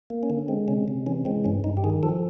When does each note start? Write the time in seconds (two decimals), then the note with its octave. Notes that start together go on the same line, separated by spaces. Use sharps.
0.10 A#3
0.23 C#4
0.30 D3
0.48 G#3 C4
0.68 C3 C#4
0.88 C3
1.06 E3 C#4
1.25 G#3 C4
1.44 G2 C#4
1.64 G2 D#4
1.77 G4
1.84 D#3 G#4
2.03 F3 A4